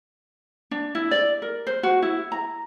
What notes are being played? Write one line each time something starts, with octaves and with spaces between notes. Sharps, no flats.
D4
E4
D5
A#4
C5
F#4
E4
A#5